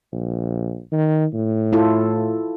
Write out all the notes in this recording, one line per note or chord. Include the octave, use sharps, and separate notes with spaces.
A#1
D#3
A2
E4 F4 A4